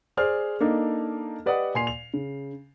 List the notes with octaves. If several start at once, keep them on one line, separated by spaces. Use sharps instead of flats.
G#4 C5 D5 F6
A#3 D4 D#4 A4
G4 B4 D5 D#5 F#5 D#6
A#2 G#5 C6 C7 F7
F7
C#3